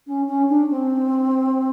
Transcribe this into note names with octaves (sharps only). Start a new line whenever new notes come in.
C#4
C#4
D4
C4